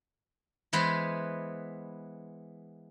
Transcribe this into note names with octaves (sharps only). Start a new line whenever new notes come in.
E3 G#3 B3 B4 C5